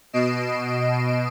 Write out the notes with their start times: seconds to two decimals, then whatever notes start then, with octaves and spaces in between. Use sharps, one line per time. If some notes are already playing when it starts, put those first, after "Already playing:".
0.13 B2 D#5 C7 D7 E7